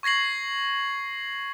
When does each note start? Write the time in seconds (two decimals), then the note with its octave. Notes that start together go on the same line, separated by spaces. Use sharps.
0.03 C#6 G#6 A#6 C7 F#7